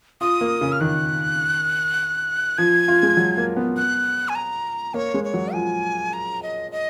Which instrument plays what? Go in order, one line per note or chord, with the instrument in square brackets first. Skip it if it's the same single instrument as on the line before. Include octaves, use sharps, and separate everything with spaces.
[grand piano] F4 [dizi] D#6
[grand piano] A#3
C#3
[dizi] F6
[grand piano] D#3 [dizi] F#6
[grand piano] F3 [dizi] G#6
[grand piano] F4
G#3
F#3
A#3
B3
[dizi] F#6
G#5
A#5
[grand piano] A#3 [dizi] C#5
[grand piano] G#3
[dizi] C#5
[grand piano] F#3
[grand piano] F3 [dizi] G#5
[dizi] A#5
D#5
D#5